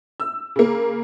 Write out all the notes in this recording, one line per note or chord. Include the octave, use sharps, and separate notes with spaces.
E6
C#3 A#3